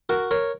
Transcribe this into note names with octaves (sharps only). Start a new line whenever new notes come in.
F#4 A#4
A#4 C#5